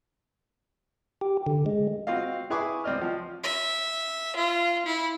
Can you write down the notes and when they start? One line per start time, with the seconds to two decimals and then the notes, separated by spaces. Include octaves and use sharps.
1.21 G4
1.46 D3
1.66 G#3
2.07 C4 F4 F#4 D#5 F5
2.50 E4 G#4 B4 G#5 C#6 D6
2.84 C#2 C4 D5 D#5 F6
3.02 F3
3.43 E5
4.36 F4
4.86 E4